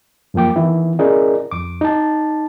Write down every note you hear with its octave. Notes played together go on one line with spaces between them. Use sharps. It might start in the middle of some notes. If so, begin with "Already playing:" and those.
F#2 F3 A#3 G5 D6
D#3 E3 B3 E4
C#4 E4 G#4 A#4 D5 D#5
F2 D6
D#4 A5